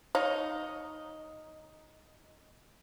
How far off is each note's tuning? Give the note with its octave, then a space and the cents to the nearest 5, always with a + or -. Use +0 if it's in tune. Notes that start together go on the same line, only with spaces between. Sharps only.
D#4 +0 C#5 +0 F5 +20